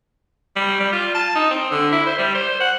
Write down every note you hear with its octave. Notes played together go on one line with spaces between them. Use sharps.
G3
G3
F4
A5
D#4
C4
D3
E4
C5
G3
C5
F#5